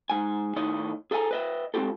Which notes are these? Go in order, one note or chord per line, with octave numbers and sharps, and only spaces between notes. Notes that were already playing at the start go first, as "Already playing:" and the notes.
G#2 G#5
A2 D#3 D#4 C#5 D#5
G#4 A4 D5 E5 G#5 A#5
B4 D#5 E5
G#3 C4 D#4 F4 G4 A4